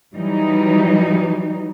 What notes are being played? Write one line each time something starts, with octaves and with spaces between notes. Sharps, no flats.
E3 F#3 G3 D#4